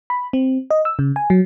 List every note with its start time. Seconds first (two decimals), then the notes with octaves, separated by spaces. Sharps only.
0.10 B5
0.33 C4
0.71 D#5
0.85 E6
0.99 C#3
1.16 G#5
1.30 F#3